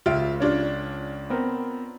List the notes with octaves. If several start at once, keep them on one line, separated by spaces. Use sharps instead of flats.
C#2 F4 E5 D7
C#4 D4 F4
B3 C4 A#4